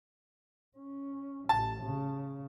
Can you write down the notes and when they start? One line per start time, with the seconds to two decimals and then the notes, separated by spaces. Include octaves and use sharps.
0.77 C#4
1.49 A1 A5
1.83 C#3